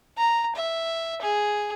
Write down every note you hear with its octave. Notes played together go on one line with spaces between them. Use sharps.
A#5
E5
G#4